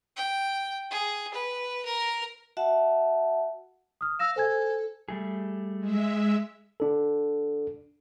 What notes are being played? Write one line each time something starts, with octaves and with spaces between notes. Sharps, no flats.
G5
G#4
B4
A#4
F#4 E5 F#5 A5
D#6 F6
F5 E6 A#6 E7
A4 C5 G#5 G#6
G3 A3 G#4
G#3 E5
D4 A4